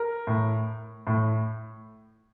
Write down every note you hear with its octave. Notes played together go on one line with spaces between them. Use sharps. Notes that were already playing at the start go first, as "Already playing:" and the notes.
Already playing: A#4
A2
A2